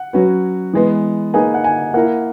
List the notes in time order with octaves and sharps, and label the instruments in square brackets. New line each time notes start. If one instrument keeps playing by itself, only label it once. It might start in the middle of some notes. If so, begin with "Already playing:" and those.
Already playing: [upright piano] F#5
[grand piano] F#3 C#4 F#4 B4
E3 G#3 B3
[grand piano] A#3 D#4 G#4 B4 [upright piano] G#5
[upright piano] F#5
G#5
[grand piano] A#3 E4 A#4 [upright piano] F#5